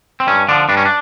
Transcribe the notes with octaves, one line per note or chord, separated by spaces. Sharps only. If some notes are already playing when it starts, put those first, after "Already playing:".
C4
G2 C#4
D3 F3 D4
G2 D4
C#4
D4